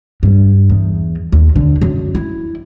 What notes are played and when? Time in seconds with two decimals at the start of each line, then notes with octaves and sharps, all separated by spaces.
0.23 G2
0.70 E2
1.32 D#2
1.56 D3
1.81 F#2
2.15 E4